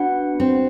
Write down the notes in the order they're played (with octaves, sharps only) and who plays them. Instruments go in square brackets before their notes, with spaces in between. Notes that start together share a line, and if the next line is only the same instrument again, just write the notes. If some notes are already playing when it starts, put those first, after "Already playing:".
Already playing: [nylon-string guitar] B3 [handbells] D4 F#4 B4 F#5
[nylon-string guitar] C4